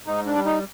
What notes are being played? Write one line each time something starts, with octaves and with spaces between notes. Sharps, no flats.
G#2 D#4
D4
G3
D#4